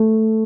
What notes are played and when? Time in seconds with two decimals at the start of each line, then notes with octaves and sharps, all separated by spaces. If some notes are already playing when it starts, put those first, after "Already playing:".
Already playing: A3